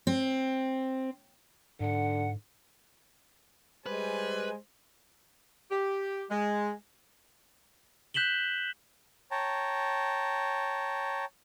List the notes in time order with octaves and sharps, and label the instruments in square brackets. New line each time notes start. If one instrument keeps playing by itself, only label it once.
[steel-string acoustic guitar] C4
[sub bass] G#2 [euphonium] D3 [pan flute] F#5
[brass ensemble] G3 G#5 [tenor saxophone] G#3 [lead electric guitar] B4 [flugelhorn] C5
[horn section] G4
G#3
[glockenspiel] F#6 G6 B6 E7 F#7 G7
[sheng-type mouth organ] C#5 G5 A5 A#5